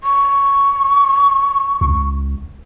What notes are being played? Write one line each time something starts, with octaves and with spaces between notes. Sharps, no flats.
C#6
C#2